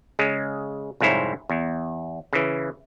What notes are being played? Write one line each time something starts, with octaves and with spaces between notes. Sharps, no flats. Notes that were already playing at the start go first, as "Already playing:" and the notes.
C#3 G#3
C2 F2 G#2 E4 C5 C#5
E2
C#3 E3